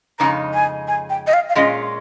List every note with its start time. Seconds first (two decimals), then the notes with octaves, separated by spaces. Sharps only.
0.19 F2 C#3 G#3 D#4 A#5
0.54 G#5
0.88 G#5
1.10 G5
1.27 D#5
1.33 F5
1.49 F5
1.55 A#2 G#3 C#4 F4 D#5